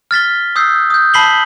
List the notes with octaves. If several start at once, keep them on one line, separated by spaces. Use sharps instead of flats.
F6 A6 B6 G7
D#6 E6 G6 C7
D#6 G6
A5 B5 B6 C7 F#7 G7